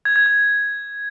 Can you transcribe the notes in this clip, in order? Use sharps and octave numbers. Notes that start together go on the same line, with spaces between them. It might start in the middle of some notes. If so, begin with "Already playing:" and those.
G#6
G#6
G#6